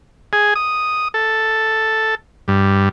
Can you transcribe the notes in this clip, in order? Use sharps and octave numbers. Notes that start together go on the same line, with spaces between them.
G#4
D#6
A4
G2